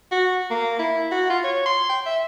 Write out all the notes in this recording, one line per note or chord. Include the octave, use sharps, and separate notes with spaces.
F#4
A#3
E4
F#4
F4
C#5
C6
G5
E5